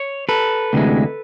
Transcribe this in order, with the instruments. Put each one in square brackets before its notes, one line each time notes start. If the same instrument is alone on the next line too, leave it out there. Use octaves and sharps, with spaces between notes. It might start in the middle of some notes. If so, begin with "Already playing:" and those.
Already playing: [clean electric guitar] C#5
A4 B4
D2 C3 E3 G#3